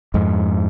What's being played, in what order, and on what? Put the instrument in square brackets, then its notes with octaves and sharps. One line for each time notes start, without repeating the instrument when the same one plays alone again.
[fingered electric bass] F2 G#2